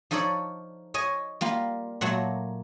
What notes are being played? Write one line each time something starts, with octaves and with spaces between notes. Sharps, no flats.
F3 D#4 A4 C#5 D5
C#5 D#5 G#5
G3 A#3 F4
A#2 F#3 A3 A#3